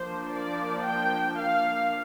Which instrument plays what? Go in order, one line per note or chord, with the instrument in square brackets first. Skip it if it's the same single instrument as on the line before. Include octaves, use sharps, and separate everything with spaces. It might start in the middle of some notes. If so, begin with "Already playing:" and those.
Already playing: [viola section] F3 A#3 D4 C5
D5
G5
F5